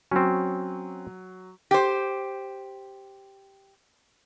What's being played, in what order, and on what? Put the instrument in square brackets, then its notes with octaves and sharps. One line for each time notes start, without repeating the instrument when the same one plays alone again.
[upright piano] F#3 [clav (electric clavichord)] C4 C#4
[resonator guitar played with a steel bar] G4 C5